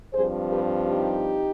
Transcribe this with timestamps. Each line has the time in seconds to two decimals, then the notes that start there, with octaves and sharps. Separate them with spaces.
0.13 G2 F3 C4 G#4 C5
0.51 G4 B4
0.87 D#4 G4